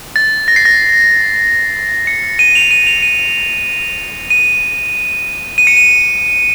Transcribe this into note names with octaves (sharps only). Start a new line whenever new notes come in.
A6
A#6
C7
A#6
C#7
D#7
F7
D#7
F7
D#7
D#7
D#7
C#7
D#7